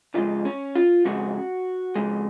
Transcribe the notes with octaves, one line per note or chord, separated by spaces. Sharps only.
F2 C#3 G#3 F4
C#4
F4
F2 C#3 G#3 F#4
F2 C#3 G#3